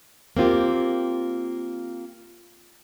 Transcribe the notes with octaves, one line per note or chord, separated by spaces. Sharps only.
A#3 C4 F4 G4